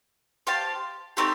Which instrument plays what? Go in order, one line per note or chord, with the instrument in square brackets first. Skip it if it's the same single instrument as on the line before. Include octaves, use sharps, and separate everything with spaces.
[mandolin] G4 C5 F5 A5
A3 C4 D#4 G4